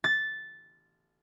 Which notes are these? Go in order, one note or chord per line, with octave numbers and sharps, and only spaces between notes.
A6